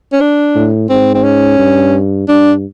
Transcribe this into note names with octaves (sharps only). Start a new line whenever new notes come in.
C#4
D4
A2
G#2 C4
C4
C#4
G2
G2 D4